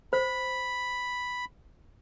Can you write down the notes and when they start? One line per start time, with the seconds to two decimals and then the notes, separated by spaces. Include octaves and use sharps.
0.13 C5 B5